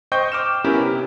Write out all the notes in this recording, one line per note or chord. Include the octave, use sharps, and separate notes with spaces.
C5 D#5 G5 C#6 G6
D6 F6 E7
B3 C#4 E4 G4 A#4
C3